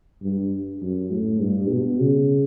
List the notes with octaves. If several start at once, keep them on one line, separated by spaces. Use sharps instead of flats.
G2
F#2
A2
G2
B2
C#3